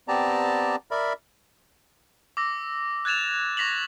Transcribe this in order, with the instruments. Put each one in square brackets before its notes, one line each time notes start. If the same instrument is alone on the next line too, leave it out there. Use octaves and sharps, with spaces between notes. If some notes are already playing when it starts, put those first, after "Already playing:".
[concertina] B3 C4 G4 D5 A5 A#5
A#4 D5 E5 B5
[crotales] D6 E6 A#6
F#6 G#6 A6 E7 F7
C#6 A#6 B6 F7 F#7